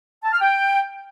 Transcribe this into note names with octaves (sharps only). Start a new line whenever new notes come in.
A5
F6
G5